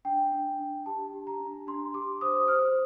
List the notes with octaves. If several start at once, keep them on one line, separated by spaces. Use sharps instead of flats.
D4 G5
D4
D4
G4 A5
G4
A#5
D4
D4 C6
G4 D6
C5 D#6
C5 F6